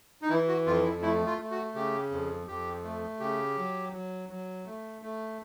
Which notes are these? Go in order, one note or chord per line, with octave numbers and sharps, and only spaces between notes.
D#4
E3 E4
F#4
F2 F4
E4
A3 E4
F4
A3
F#4
C#3 G4
F2
F2 G4
A3
C#3 G4
F#3
F#3
F#3
A3
A3